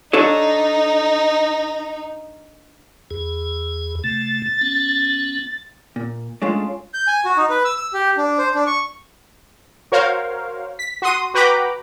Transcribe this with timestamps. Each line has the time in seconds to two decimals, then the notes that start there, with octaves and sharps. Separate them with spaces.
0.13 D4 D#4 A4 C#5
3.11 E2 G#4
4.04 C3 A3 A6
4.61 B3 C#4
5.96 A#2
6.42 G#3 A3 C#4 D4 F4 G#4
6.94 G6
7.07 G#5
7.25 F#4
7.37 D#4
7.50 B4
7.65 E6
7.77 E6
7.93 G4
8.17 D4
8.38 C5
8.55 D4
8.67 C#6
9.92 F#4 A#4 C5 C#5 F5
10.79 B6
11.02 F#4 C6 D#6
11.34 F#4 B4 G5 A#5 B5 D6